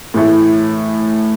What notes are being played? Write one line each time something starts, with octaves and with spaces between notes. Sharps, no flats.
A2 E3 A3